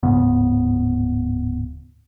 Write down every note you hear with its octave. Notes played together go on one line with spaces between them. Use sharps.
D1 G#2 C#3 B3